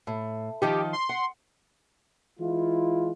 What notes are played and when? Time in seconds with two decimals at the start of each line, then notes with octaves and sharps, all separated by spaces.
0.07 A2
0.62 D#3 F3 D#4 G4
0.93 C6
1.09 F#5
2.40 E3 G#3 E4 F4